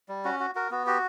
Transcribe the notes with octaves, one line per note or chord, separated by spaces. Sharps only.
G3
C#4 F#4
F#4
F#4 A#4
B3 F#4
F#4 G4